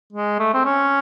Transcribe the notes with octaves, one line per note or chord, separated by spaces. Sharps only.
G#3
A3
C4
C#4